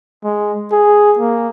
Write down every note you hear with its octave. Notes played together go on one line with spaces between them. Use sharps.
G#3
G#4
A#3